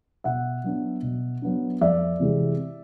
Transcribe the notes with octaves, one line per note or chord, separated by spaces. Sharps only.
B2 E5 F#5
F#3 B3 D4
B2
F#3 B3 D4
F2 D5 E5
C3 E3 G#3